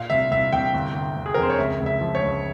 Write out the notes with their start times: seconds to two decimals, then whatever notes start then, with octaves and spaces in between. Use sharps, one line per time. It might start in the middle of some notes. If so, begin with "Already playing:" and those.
Already playing: A#2 F5
0.10 C2 E5
0.31 C2 E5
0.53 C2 G5
0.74 G1
0.94 G1
1.16 G1
1.26 G#4
1.34 F2 A#4
1.42 C5
1.50 C#5
1.58 C#2 E5
1.80 C#2
1.86 E5
2.01 F3
2.15 C#5
2.22 C#2